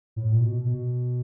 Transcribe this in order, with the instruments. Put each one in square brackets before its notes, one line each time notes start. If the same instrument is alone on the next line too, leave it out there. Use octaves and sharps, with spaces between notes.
[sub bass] A2
A#2
B2
B2